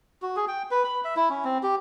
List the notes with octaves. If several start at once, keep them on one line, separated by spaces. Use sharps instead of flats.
F#4
G#4
G5
B4
B5
E5
E4
C#4
C4
G4